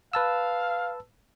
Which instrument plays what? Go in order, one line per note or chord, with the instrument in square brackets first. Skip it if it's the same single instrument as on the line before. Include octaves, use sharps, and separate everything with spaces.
[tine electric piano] B4 A5 E6 [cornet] F5